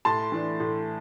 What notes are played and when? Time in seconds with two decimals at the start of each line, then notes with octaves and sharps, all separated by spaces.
0.05 A2 A5 C6
0.32 E3 A3 D4
0.60 A2